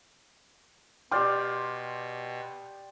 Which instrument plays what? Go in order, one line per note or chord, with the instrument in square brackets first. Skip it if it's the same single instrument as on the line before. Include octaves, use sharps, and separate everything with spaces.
[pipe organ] B2 [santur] G4 D5 G5 [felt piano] C6 D6 F6